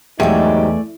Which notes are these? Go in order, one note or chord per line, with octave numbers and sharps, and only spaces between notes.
E2 G#2 F#3 A3 D#4 G4 D5 G#5